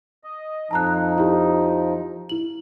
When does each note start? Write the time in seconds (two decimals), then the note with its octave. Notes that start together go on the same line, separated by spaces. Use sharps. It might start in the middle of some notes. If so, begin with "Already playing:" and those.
0.24 D#5
0.71 F2 F3 D#4 A5 A#5 F#6
1.18 E4 G4
2.29 E4 F#7